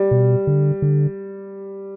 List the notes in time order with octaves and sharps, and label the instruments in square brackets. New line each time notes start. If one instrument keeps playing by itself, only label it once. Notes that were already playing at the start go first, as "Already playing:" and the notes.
Already playing: [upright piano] G3
[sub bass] B2
D3
D3